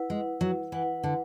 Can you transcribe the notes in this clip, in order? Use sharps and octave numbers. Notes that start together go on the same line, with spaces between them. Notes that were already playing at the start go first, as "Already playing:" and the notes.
Already playing: E4 B4 F#5
G#3
F#3
E3 E4 B4 F#5
D3